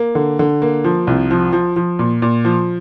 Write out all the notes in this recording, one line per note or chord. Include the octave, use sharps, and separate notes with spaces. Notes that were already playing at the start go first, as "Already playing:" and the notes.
Already playing: A#3
D3
D3
A#3
F3
C2
F3
F3
F3
A#2
A#2
F3